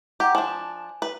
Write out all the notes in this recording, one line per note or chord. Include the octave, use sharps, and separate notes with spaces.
G4 F#5 A#5
F3 D4 G#5
B4